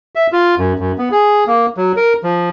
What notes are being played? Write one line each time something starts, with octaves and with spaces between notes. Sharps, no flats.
E5
F4
F#2
F#2
B3
G#4
A#3
F#3
A#4
F3